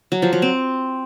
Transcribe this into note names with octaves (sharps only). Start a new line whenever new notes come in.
F#3
F3
F#3
C4